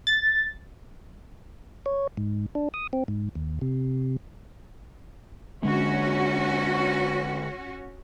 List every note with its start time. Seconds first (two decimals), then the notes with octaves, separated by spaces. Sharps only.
0.07 A6
1.86 C#5
2.17 G#2
2.55 D4
2.74 D#6
2.93 C4
3.08 G#2
3.35 D#2
3.61 C3
5.63 D3 G#3 C#4 F#4